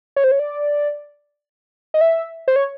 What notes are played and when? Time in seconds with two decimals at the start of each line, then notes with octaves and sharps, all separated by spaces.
0.16 C#5
0.24 C5
0.31 C#5
0.39 D5
1.94 D#5
2.01 E5
2.48 C5
2.56 C#5